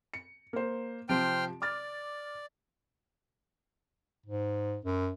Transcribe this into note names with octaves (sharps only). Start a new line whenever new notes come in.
C#7
A#3 C5
C3 F3 C5 G5 F6 D7
D5 D6 F6 A6
G#2
F#2